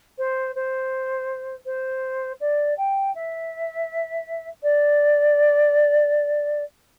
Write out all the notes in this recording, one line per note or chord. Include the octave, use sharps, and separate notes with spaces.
C5
C5
C5
D5
G5
E5
D5